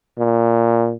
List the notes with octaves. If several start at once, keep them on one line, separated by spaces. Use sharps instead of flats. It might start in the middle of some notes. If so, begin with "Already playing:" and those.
A#2